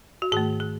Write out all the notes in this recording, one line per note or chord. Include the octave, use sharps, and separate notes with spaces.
F#4
G#2 D#3 A3 G#4
G#4